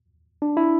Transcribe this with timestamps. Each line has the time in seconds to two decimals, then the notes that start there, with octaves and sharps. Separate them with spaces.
0.42 D4
0.57 E4